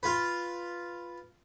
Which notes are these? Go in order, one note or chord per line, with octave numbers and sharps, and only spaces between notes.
F4 B4